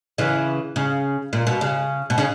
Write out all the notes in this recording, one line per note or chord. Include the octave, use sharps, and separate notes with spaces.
C#3 E3
C#3
A#2
B2
C#3
B2
C#3